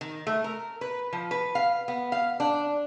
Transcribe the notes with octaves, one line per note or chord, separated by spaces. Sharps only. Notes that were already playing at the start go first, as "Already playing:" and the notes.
D#3
A3
A#4
B4
F3
B4
F5
B3
F5
D4